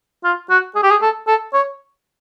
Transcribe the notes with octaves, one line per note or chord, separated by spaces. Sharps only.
F4
F#4
G#4
G4
G#4
A4
A4
C#5